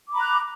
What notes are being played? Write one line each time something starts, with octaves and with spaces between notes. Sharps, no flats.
A#5 B5 D6 F#6